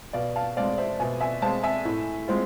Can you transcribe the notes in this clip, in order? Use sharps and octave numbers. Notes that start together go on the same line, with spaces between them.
B2 D5 F5
F5 A5
G#3 C4 D5 F5
C5 E5
B2 E5 G#5
E5 G#5
G#3 C4 F5 A5
E5 G#5
A2
G#3 C4 F4